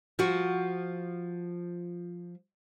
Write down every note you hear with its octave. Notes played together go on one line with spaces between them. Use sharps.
F3 F#4